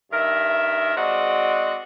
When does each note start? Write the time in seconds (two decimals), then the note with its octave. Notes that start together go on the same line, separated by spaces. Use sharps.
0.12 G2 D#3 A#4 E5
0.96 G#3 C4 F#4 D5 D#5